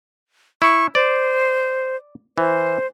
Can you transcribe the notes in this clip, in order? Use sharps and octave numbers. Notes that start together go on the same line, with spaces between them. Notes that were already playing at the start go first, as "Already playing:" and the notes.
E4 C#6
C5 D5
E3 C5